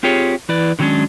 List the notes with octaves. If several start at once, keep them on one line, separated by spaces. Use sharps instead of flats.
C4 F4 G4 G#4 C#5
E3 E4 B4 D5
D3 D#3 F#3 G#3 C#4 D4